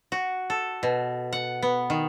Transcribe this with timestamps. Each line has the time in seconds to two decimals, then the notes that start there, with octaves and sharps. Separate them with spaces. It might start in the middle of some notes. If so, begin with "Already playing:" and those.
0.12 F#4
0.50 A4
0.83 B2
1.33 F#5
1.62 B3
1.90 D#3